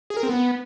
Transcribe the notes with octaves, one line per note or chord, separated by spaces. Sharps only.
G#4
A#4
C4
B3